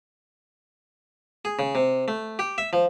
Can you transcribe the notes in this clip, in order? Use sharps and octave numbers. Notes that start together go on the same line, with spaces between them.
G#4
C#3
C3
A3
G4
E5
F3